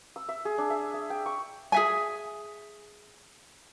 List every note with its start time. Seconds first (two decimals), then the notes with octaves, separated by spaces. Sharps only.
0.16 E6
0.29 E5
0.45 G#4
0.58 D4
0.70 E5
0.94 E5
1.10 G5
1.26 C#6
1.72 G#4 E5 G#5